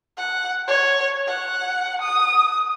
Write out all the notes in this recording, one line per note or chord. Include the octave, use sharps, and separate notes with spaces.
F#5
C#5
F#5
D#6